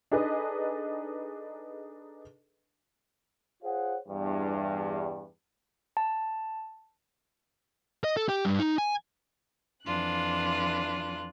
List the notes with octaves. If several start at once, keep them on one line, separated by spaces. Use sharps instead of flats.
D4 D#4 G#4 A4 B4 D#5
F4 G#4 C5 C#5 F5 F#5
E2 G2
A5
D#5
A4
G4
G2
D#4
G#5
F2 E3 D4 F4 F#6